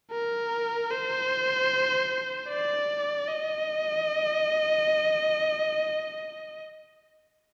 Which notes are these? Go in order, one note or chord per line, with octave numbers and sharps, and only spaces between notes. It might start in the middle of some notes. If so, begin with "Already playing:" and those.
A#4
C5
D5
D#5